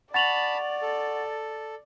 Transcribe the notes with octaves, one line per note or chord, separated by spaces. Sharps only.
D5 F#5 A5 B5 C#6 A6 F7 F#7
A4